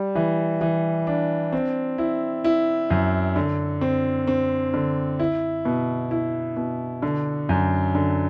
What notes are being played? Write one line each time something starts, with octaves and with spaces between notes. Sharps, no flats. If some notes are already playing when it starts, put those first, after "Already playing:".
Already playing: G3
E3
E3
D4
C4
E4
E4
F#2
D3
C4
C4
D3
E4
B2
E4
B2
D3
F#2
D3